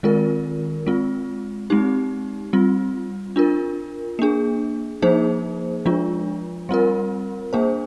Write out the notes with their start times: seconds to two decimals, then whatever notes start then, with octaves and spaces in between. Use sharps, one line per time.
0.03 D#3 G#3 C4 F4 A#4
0.87 G#3 C4 F4
1.70 G#3 C4 D#4 G4
2.53 G3 C4 F4
3.36 D4 F4 A#4
4.19 A#3 D4 G#4
5.02 F3 A#3 D#4 G#4 C5
5.86 F3 G#3 D4 F4
6.69 G3 C4 F4 A#4
7.53 A#3 D4 G#4 C5